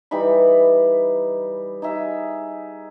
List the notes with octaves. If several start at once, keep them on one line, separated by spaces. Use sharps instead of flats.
E3 G3 D#4 B5
D#4 G#4 E5